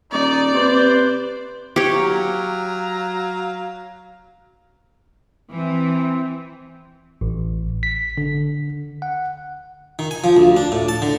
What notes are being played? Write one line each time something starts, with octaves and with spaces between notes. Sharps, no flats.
D#1 D#4 D5
C3 B4 C5
G4 C#5
F#3 F5 A#5
E3 C4
A1
B6
D3
F#5
D#3
G#5
F3
D2
D4
A2
A5
D3